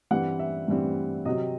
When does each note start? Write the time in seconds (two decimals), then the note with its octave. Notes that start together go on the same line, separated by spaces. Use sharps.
0.11 G2 E3 G3 C4 F#5
0.39 E5
0.68 G2 E3 G3 C4
1.25 C3 F#3 C4 D#5